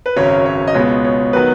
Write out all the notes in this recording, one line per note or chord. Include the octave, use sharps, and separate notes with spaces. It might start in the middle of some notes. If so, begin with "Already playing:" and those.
B4
G#1 F#2 C#3 F#3 C#4 C#5
C#5
D#5
C#2 B2 G#3 B3 C#5
C#5
D#3 F#3 B3 B4